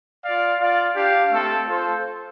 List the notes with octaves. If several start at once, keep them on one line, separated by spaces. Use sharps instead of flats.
F4 D5 F5
F4 D5 F5
D4 G4 F5
A3 C4 A4
F4 A4 C5